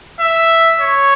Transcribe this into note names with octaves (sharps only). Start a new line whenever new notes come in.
E5
C#5